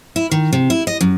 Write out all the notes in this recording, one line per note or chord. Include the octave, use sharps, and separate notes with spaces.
E4
D#3
C3
E4
D#5
F#2